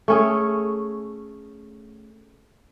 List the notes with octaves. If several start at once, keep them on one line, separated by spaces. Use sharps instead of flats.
A3 C#4 G#4